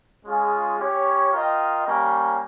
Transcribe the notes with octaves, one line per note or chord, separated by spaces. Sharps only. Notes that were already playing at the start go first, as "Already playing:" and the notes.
G#3 C#4 F4 G#4
C#4 G4 C#5
F4 A#4 D#5 G5
G3 A#3 C#4